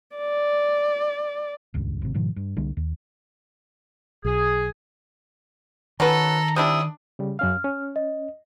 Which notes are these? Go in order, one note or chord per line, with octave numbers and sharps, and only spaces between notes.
D5
D#1 C#2 G2
G#1 C3
G#2 B2 D#3 F3
G2
C2 D3 G3 A#3
D#2
B1 G#4
D#3 C#4 F#4 A4 B4 A#5
C3 G3 D4 E4 D#6
C#3 G3
F#2 C#4 F5 F6
C#4
D#5